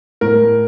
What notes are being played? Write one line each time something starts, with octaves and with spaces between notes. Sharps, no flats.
A2 A#4